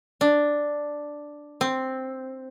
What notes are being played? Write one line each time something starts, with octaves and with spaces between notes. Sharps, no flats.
D4
C4